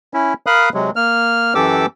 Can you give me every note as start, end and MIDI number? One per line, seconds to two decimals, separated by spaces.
0.14 0.33 61
0.14 0.33 64
0.46 0.69 70
0.46 0.69 77
0.46 0.69 83
0.46 0.69 87
0.46 0.69 90
0.74 0.91 48
0.74 0.91 54
0.74 0.91 56
0.96 1.54 58
0.96 1.54 89
1.55 1.86 42
1.55 1.86 52
1.55 1.86 67
1.55 1.86 69
1.55 1.86 86
1.55 1.86 88